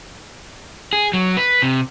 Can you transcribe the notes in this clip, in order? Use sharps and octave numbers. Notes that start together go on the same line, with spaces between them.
G#4
F#3
B4
C3